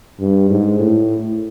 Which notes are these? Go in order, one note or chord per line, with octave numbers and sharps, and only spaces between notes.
G2
G#2
A2